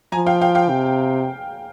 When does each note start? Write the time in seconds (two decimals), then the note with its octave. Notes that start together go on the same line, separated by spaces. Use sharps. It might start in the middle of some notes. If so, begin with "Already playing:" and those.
0.12 F3 G#5 A#5
0.26 F5 G5
0.41 F5 G5
0.55 F5 G5
0.70 C3